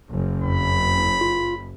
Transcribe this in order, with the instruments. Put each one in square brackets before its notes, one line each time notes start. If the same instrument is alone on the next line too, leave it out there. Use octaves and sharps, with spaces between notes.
[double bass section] F#1
[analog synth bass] F2 [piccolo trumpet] B5
[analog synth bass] F4